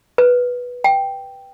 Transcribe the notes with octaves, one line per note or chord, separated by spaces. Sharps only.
B4
G5